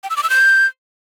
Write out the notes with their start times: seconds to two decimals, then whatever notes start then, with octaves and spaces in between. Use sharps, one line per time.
0.04 G5
0.10 E6
0.17 D6
0.23 E6
0.30 G6